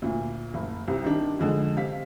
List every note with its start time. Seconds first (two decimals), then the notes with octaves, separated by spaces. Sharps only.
0.02 D2 A#2
0.54 F#1
0.88 C2 C3
1.04 D#3 D4
1.39 F2 D3 G#3
1.76 C3 F5 B6